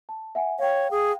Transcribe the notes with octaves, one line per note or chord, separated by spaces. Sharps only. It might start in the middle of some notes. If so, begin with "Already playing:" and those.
A5
E5 F#5 G#5
C#5 F5 G5
G#4